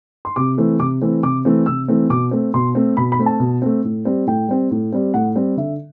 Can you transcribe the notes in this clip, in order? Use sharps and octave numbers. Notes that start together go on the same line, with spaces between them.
C6
C3 D6
E3 A3 C4
C3 D6
E3 A3 C4
C3 D6
E3 A3 C4
C3 E6
E3 A3 C4
B2 D6
A3 C4
B2 C6
A3 C4
B2 B5
B5
A3 C4
A5
B2
A3 C4
A2
G3 C4
A2 G5
G3 C4
A2
G3 C4
A2 F#5
G3 C4
D3 E5